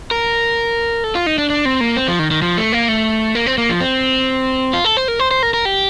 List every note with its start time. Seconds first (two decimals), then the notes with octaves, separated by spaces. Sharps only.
0.11 A#4
1.04 A4
1.15 F4
1.26 D#4
1.38 D4
1.50 D4
1.65 C4
1.81 A#3
1.97 C4
2.08 F3
2.19 D#3
2.31 D#3
2.42 F3
2.58 A3
2.73 A#3
2.88 A3
3.35 A#3
3.46 C4
3.58 A#3
3.69 F3
3.81 C4
4.73 F4
4.84 A4
4.97 C5
5.08 A#4
5.19 C5
5.31 C5
5.43 A#4
5.54 A#4
5.65 G4